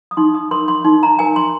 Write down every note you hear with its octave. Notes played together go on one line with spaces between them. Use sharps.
D#6
D#4 C6
D#6
A#4 C6
C6
D#4 C6
A#5
A#4 G#5
C6